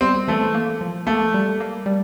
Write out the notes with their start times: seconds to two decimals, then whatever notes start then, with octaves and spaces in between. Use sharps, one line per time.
0.01 G3 C4
0.28 E3 A3
0.55 A#3
0.81 F3
1.07 A3 A#3
1.34 G3
1.60 A#3
1.86 G3